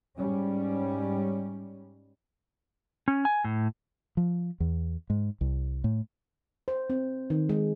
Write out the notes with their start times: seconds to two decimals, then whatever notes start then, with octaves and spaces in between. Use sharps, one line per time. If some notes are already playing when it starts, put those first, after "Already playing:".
0.16 G#2 G3 C#4
3.08 C#4
3.25 G#5
3.44 A2
4.17 F3
4.60 E2
5.10 G#2
5.41 C2
5.84 A2
6.68 C5
6.90 C4
7.30 D#3
7.49 G#3